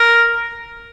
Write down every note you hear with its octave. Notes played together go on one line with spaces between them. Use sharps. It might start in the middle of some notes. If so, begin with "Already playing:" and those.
Already playing: A#4